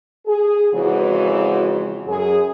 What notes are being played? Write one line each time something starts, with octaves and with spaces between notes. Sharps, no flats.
G#4
F2 C#3 E3 G#3 F#4
F#2 G#4